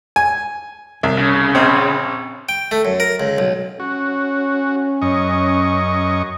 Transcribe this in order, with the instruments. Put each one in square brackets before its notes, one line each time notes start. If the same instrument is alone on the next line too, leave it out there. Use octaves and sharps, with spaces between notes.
[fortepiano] G#5
C2
[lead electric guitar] C#3
[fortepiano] A#1 C4
[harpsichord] G5
A3
F#2
A#4
C#2
B1
[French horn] C#4 [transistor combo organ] F#4
[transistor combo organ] F#2 D#5 C#6